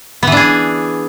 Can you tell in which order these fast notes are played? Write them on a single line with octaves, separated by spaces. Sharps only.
B3 E3 D4 G#4